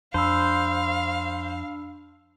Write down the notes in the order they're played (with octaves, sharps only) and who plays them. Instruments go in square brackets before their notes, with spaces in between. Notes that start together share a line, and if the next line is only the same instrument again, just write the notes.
[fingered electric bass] F2 [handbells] D4 B5 E6 [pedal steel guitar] C5 [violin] F5